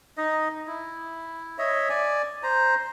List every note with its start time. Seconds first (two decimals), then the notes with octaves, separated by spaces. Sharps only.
0.17 D#4 D#5
0.67 E4
1.58 C#5 D#5 E5
1.90 D5 G#5
2.43 C5 A#5